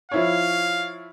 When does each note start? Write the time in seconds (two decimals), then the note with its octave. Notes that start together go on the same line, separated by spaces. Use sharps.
0.12 F3 E4 C#5 F5